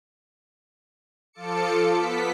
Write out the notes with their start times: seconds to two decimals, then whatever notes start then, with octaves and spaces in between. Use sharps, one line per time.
1.33 F3 F4 A4 A5 D6 C#7
1.92 B3 B6